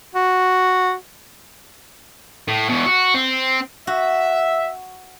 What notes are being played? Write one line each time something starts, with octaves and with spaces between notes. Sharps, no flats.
F#4
A2
E2 B2
F#4
C4
F#4 E5